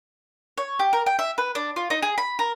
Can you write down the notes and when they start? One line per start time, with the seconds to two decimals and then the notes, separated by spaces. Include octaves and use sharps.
0.58 C#5
0.79 G4
0.93 A#4
1.06 G5
1.19 E5
1.38 B4
1.55 D4
1.76 F4
1.90 D#4
2.02 G#4
2.18 B5
2.39 A#4